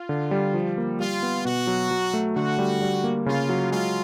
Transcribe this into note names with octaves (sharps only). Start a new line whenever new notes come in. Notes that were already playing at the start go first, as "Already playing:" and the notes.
Already playing: F4
D3
G3
F3
A#3
G3 F4
B3
B2 F#4
F#3
F#3
A3
D3 F#4
G3
G3
A#3
C#3 F4
F#3
G#3 F4